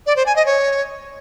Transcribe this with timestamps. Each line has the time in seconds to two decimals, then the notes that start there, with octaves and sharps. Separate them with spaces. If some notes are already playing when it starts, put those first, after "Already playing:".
0.06 D5
0.16 C5
0.26 G#5
0.36 D#5
0.46 C#5